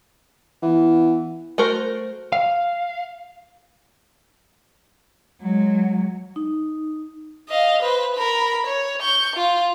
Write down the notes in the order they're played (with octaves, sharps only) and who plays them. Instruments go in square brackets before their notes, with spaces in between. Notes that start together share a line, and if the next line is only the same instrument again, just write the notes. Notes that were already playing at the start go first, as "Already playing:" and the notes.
[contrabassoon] E3 [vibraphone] B3 E4 F#5
[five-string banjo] A3 F#4 A#4 C5
[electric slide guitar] F5
[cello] F#3 G#3
[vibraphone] D#4
[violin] D#5 F5
B4 C5
A#4 B5
C#5
C#6 G6
F4